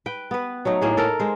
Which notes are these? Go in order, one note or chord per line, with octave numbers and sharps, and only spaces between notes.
B4 G5
B3 B4
F#3 A3 D#4
A2 A#3 G#4
A4 A#4
G#3 C5